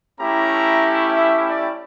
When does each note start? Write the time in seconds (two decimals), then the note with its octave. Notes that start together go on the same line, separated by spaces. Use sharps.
0.20 A3 C#4 E4 G4 A#5
1.14 E5
1.46 D5